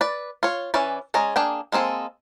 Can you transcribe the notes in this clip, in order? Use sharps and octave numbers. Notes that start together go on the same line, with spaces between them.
B4 D5
F4 C#5
E3 C#4 B4 D5
G#3 C#4 G#4 D5 A#5
A#3 D4 G#4 G5
G#3 A#3 C4 G#4 A4